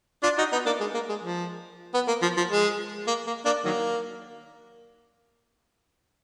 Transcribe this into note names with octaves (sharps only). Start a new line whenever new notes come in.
D4 F4
D#4 F#4
B3 D#4
A#3 D4
G#3
A#3
G#3
F3
B3
A#3
F3
F3
G#3
A#3
A#3
A#3 D4
D#3 F#3 A#3